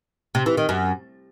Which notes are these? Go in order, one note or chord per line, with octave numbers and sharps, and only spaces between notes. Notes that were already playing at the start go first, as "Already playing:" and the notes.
C3
E3
D#3
F#2